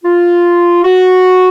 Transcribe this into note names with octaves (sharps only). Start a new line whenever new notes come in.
F4
F#4